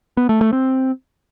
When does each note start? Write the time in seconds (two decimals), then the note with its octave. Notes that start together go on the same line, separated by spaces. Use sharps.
0.17 B3
0.29 A3
0.41 A3
0.53 C4